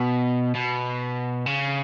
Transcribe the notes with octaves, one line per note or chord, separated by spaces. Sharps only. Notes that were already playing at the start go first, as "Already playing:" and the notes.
Already playing: B2
B2
C#3